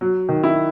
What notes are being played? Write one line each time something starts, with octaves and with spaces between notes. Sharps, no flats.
F#3
D#3
E4